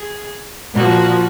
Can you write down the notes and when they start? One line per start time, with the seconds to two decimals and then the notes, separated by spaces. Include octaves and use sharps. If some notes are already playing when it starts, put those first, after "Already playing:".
Already playing: G#4
0.74 A#2 F3 F#4